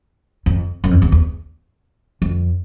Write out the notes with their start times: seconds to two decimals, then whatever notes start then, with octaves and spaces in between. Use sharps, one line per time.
0.46 F2
0.84 F#2
0.91 F2
1.02 E2
1.12 E2
2.22 F2